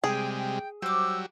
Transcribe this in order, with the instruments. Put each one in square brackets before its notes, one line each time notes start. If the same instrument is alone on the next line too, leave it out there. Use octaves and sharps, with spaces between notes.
[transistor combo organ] C3 G3 G#3 [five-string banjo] G#4 [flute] G5
[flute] G5
[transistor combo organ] F#3 G3 [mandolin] C5 D6 [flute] E6